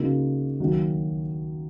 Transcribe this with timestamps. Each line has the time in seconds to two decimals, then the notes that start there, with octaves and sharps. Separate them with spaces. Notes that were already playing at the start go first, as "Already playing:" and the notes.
Already playing: C#3 A#3 D#4 F#4
0.60 D#3 F#3 A#3 F#4